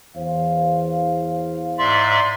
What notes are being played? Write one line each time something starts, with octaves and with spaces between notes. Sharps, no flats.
E2 C5 F5
G#2 D5 E5 C6